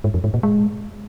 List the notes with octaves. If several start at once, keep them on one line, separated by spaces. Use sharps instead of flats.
G#2
F2
G#2
A#2
G#3